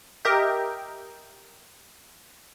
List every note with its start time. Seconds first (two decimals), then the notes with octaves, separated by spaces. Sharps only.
0.25 G4 A#4 D#5 E5 G5